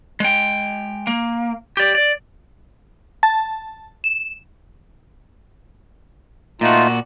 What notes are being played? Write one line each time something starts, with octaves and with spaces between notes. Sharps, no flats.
G#3 G5
A#3
G4 D5
D5
A5
E7
A#2 A3 D#4 F4 F#4